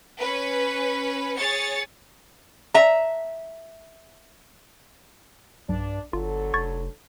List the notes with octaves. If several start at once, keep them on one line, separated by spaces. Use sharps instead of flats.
C#4 B4
G#4 C#5 A6 C#7
E5 A#5
B1 G2 D4
G1 D3 F#3 F4 A4
F1 C#6 G#6 A6